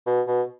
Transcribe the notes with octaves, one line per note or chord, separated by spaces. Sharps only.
B2
B2